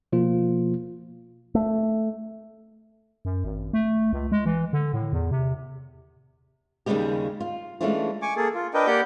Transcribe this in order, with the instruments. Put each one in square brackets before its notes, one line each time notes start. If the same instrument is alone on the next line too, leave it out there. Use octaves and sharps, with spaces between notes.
[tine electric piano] B2 F3 A#3 F4
[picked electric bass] A3
[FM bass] F#2
G#1
A3
C#2
G#3
E3
D3
A2
E2
C3
[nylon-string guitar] D#2 C#3 E3 G3 G#3 G4
F4
E3 G#3 A3 C#4 D4 F4
[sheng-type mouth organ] G#5 C#6 D6
A#3 G#4 A4
F4
D4 A#4 B4 D#5 G5
A#3 G4 D5 F#5 G6